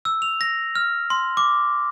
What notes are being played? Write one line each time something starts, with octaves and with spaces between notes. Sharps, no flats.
E6
F7
A#6
F6
C6
D6